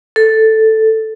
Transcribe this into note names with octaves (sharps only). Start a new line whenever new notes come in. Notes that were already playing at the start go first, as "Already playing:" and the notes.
A4